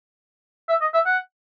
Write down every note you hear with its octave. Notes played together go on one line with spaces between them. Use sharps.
E5
D#5
E5
F#5